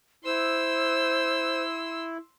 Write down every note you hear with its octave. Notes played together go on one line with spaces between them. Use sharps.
E4 C5 C6 E6